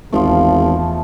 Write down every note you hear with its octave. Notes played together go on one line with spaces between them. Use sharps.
G#1 E2 F3 A3